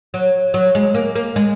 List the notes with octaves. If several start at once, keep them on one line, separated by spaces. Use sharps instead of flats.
F#3
F#3
G#3
A#3
A#3
G#3